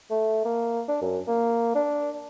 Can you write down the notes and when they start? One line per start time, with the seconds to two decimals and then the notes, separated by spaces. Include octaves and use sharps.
0.11 A3
0.45 A#3
0.88 D4
1.01 F#2
1.27 A#3
1.75 D4